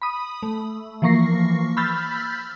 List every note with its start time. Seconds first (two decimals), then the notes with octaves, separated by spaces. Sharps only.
0.02 B5 D#6
0.43 A3
1.02 E3 F3 A#3 C#6 A#6 C7
1.77 B5 E6 F6 G6 A6 B6